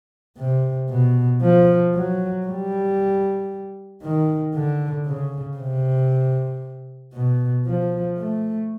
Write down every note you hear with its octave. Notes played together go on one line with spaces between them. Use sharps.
C3
B2
F3
F#3
G3
D#3
D3
C#3
C3
B2
F3
A3